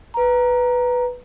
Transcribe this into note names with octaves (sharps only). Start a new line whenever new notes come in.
B4 A#5